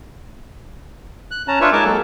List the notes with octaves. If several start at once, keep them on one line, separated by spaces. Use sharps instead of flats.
F#6
C#4 A5 A#5
D4 F4 B4 C#5 E5
G#3 D#4 A#4 G#5 A5 D6
F#3 G#3 A#3 A4